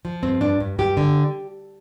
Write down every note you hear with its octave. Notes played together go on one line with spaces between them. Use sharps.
F3
G2 C4
G2 D4
G2
G2 G4
D3